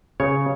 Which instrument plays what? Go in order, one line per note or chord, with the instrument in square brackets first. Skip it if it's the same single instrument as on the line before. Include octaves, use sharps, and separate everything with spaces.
[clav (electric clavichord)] C#3 C#5